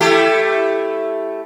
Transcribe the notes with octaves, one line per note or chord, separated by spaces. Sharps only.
A3 E4 G4